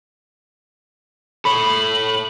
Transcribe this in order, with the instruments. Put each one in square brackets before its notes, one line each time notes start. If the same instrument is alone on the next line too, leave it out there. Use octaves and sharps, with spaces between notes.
[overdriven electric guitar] A4 C#5 [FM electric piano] B5 [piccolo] F#7